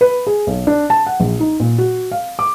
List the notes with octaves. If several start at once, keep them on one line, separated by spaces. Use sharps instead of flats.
B4
G#4
B1
D4
A5
F#5
A#1
D#4
A#2
F#4
F5
D6